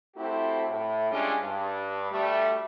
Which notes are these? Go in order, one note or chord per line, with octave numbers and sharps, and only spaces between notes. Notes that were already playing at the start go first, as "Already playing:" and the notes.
A3 C4 E4 F#4 G4 A4
A2
G3 G#3 C#4 D4 F4 G4
G2
D2 G3 A3